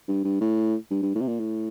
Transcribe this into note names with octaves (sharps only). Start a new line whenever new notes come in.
G2
G2
A2
G2
G2
A2
C3
A#2
A2